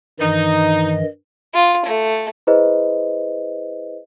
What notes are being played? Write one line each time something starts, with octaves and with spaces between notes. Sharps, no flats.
G2 D#3 E3 D#4 D#5
F4
A3
E4 G#4 B4 C5 D#5